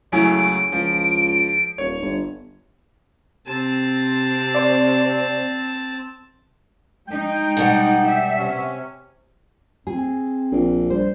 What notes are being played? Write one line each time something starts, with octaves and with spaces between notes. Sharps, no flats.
C#2 F#3 A3 C#4 E4 G#4 D7
C#2 F3
D#1 C#5
G1
C3 C4 A5
C5 D5
G#3 D#4 G5
B2 G3 F#5
E5
C3 C#4
C4 G#4
A#1
G3 C5